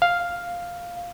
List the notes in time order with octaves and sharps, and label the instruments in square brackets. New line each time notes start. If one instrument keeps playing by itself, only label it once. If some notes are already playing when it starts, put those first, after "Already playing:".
[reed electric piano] F5